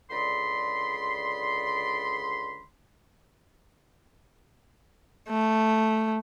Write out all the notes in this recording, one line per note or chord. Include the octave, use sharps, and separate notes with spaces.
C#2 D3 G#4 D5 B5 C6
A3